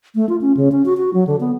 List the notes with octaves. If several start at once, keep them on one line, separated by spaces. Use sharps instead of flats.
A3
F4
C#4
C#3
C#4
F#4
F#4
F#3
D3
B3